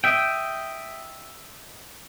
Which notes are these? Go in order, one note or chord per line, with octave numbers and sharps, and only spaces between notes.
D#5 E5 G5